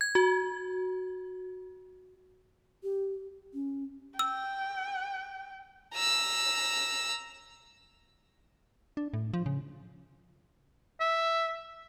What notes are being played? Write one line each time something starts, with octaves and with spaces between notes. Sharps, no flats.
G#6
F#4
G4
C#4
G5 E6
A#5 E6
D4
A2
F3
C#3
E5